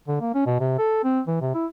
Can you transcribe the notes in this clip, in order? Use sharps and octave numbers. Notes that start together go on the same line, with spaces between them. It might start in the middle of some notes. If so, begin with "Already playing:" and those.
D3
A#3
C#4
B2
C3
A4
C4
E3
C3
E4